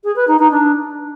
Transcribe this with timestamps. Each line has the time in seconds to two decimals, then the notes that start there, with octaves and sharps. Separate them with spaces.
0.04 G#4
0.16 B4
0.27 D#4
0.39 D#4
0.51 D4